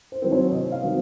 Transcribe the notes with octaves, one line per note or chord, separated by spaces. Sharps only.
C5
D#3 F#3 C4
C#5
C3 D#5
F5
D#3 F#3 C4